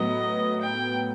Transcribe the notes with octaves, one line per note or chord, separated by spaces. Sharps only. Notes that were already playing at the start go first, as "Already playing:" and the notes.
Already playing: A2 F#3 B3 D#5
G5